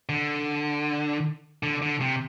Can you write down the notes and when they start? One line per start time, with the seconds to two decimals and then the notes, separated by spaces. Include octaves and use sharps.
0.09 D3
1.63 D3
1.82 D3
2.01 C3